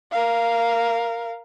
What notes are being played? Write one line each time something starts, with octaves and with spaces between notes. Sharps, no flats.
A#4 F5